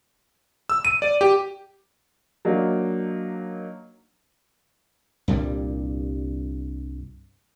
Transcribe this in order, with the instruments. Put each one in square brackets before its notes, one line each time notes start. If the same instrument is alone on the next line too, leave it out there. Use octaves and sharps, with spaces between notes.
[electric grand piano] E6
D#7
D5
G4
[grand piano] F#3 A#3 D4 D#4
[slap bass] C2 G2 A#2 G3